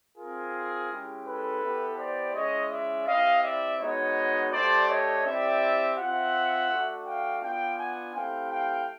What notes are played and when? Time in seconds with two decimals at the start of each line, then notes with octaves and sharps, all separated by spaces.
0.16 C4 F4 G#4 A#4
0.89 G#3 C#4 E4 G4
1.26 A4 B4
1.62 B3 E4 G4
1.98 C5 D5
2.34 G#3 C#4 E4 C#5 D#5
2.70 D5 E5
3.07 C4 E4 G4 D#5 F5
3.43 D5 E5
3.80 G#3 B3 D#4 F#4 C#5 D#5
4.52 A3 D4 G4 C5 D5
4.88 C#5 D#5
5.25 C4 E4 G4 D5 E5
5.97 C4 F4 E5 F#5
6.70 A3 D4 F#4
7.06 F5 G5
7.42 B3 D4 F4 F5 G5
7.78 F#5 G#5
8.15 A3 C4 E4 G4 F5 G5
8.52 F5 G5